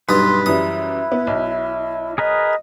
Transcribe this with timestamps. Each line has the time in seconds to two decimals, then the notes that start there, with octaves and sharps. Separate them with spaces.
0.09 B1 G2 B4 C6 D#6
0.46 F#2 E3 G3 E4 D#6
1.12 B3
1.27 B1
2.18 G#4 A#4 B4 D#5